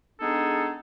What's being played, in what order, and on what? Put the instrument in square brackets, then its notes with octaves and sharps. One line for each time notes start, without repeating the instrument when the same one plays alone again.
[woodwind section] G#3 B3 D4 D#4 G#4 A4